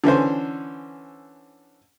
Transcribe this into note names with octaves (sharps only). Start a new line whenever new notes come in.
D3 E3 C#4 C5